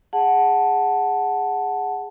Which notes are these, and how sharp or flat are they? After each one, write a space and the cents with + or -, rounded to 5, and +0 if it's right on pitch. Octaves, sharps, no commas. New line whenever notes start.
G#4 -10 F#5 +0 A5 +0